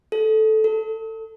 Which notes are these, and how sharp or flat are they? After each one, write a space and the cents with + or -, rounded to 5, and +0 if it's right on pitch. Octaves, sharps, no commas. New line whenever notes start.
A4 -10
A4 +20